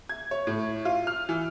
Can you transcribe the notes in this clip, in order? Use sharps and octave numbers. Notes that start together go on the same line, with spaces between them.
G#6
C#5
A2
F4
F6
E3